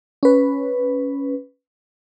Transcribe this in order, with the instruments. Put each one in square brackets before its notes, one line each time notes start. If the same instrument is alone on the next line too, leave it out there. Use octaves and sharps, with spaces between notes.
[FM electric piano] C#4 B4